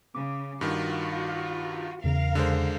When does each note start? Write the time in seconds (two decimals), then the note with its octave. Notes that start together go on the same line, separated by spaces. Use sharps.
0.15 C#3 D6
0.61 G2 D#3 F4 F#4
2.04 E2 C#3 A#4 F5
2.35 D3 G#3 C5